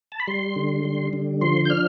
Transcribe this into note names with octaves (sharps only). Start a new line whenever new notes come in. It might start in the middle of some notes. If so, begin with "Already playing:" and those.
A5
B5
G3 C6
D3
G3
D3
F3 C6
G6
D4 F6